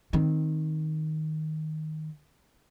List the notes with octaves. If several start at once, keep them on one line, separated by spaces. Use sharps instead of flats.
D#3 C4